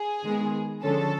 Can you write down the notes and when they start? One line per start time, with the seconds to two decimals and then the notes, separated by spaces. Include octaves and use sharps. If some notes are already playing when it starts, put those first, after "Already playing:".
Already playing: G#4
0.23 D#3 G#3 B3
0.83 D3 F3 G#3 C#4 A4